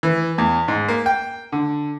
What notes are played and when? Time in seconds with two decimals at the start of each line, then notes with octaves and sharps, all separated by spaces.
0.03 E3
0.38 E2
0.68 G#2
0.88 A#3
1.06 G5
1.52 D3